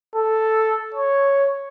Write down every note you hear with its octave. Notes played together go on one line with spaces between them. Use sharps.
A4
C#5